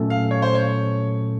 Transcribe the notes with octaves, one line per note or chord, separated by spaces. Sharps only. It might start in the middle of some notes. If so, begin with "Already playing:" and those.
Already playing: A#2 F#3 A3 C#4 A4
F5
C#5
C5
C#5